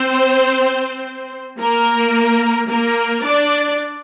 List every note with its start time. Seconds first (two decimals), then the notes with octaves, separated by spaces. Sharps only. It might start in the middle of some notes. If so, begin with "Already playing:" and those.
Already playing: C4 C5
1.58 A#3 A#4
2.68 A#3 A#4
3.24 D4 D5